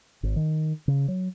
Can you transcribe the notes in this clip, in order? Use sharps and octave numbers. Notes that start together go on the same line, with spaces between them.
G#1
D#3
C#3
F#3